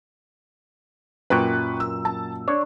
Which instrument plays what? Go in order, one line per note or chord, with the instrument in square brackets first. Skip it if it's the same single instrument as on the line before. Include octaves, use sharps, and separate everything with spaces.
[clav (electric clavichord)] F#2 A#2 [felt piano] B4 G5 C#6
[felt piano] E6
A5
[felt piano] D4 [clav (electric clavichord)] C#5